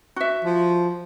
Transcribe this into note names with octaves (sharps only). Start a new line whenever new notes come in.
F#4 E5
F3